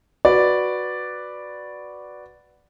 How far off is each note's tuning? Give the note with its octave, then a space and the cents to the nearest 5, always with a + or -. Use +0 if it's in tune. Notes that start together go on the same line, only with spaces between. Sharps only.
F#4 +0 B4 +0 D5 +0